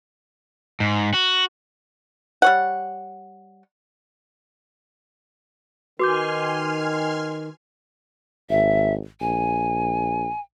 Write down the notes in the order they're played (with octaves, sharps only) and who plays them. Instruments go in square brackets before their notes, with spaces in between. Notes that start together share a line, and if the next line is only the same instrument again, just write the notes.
[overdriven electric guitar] G#2
F#4
[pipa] G3 C#5 F#5
[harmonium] D#3 [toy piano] F#4 [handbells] B4 D6 G6 [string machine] G#5 C6 F6
[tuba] G#1 [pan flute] E5
[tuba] A#1 [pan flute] G#5